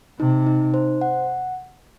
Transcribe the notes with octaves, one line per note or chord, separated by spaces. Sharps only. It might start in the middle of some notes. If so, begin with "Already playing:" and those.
C3 D#4
D#4
C5
F#5